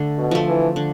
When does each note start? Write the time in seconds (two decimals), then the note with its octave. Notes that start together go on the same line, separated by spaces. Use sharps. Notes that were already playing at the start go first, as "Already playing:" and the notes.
Already playing: D3 A3
0.18 B2
0.31 F3 A3
0.47 E3
0.76 D3